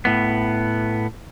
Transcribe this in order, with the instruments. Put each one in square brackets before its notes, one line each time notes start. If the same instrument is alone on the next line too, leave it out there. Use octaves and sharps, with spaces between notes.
[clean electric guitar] A2 B3